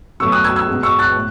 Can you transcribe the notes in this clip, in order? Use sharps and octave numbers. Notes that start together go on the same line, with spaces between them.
B2 F#3 A3 C#6 E6
D#6 F#6
E6 G#6
E6 G#6
B2 G#3
C#6 E6
F#6 A6
A2